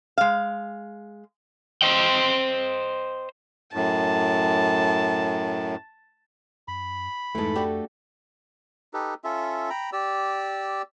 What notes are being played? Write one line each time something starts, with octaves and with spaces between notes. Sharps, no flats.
G#3 F5
C5 D#5 G5
F#2 A2 A5
F#2 B5
F2 G#2 E3 A3 A4
D4 F#4 G4
D#4 G4 A4 B4
C#4 F4 A4 E5
G5 A#5 B5
G4 D5 E6